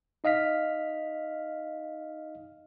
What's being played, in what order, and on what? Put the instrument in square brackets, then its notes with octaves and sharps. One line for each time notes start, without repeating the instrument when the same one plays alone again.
[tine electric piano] D#4 D#5 F5 F6 B6